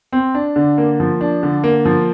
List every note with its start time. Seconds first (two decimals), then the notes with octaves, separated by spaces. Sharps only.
0.13 C4
0.35 D4
0.56 D3
0.78 A#3
1.00 F3
1.21 D4
1.43 D3
1.64 A#3
1.85 F3